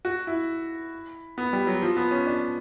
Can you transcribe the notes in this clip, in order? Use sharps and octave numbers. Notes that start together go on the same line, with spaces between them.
F#4
E4
B3
G3
F#3
F3
B3
C#4
D4